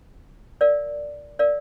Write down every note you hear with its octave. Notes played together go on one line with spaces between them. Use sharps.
A#4 D5 F5
A#4 D5 F5